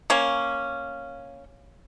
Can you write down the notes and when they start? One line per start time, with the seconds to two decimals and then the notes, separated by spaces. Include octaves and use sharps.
0.10 A#3 C#4